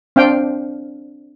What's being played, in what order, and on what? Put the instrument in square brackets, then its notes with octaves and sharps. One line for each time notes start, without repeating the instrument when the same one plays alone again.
[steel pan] C4 D4 F5 G5